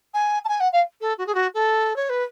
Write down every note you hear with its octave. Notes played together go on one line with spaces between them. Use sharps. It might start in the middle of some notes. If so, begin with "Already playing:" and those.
G#5
A5
G#5
F#5
F5
A4
F#4
G#4
F#4
A4
C#5
B4